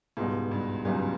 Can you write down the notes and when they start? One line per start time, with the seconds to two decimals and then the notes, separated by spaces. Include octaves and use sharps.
0.17 C#2 G#2 B2 G3
0.51 G2
0.85 C#2 F#2 B2 G3